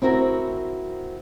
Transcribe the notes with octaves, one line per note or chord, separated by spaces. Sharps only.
C4 E4 F#4 A#4